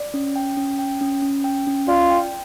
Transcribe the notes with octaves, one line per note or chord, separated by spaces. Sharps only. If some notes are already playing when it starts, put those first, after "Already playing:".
Already playing: D5
C#4
G5
C#4
G5
C#4
C#4
G5
C#4
F4 D5
G5